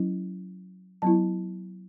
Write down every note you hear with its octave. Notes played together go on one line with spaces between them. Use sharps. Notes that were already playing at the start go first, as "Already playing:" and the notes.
Already playing: F#3 C#4 E4
F#3 B3 E4 A5